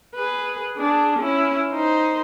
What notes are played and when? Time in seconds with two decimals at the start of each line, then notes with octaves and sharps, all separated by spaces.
0.15 G#4 B4
0.77 D4 G#4
1.20 C#4 E4
1.72 D#4 C5